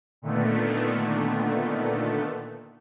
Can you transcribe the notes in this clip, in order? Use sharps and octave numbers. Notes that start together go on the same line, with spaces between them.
A#2 D3 D#3 A3 B3